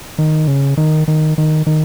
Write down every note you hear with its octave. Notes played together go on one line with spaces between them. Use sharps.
D#3
C#3
D#3
D#3
D#3
D#3